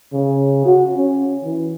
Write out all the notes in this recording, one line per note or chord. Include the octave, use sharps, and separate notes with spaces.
C#3
F#4
C#4
E3